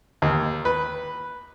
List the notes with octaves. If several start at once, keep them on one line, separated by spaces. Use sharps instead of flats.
D#2
B4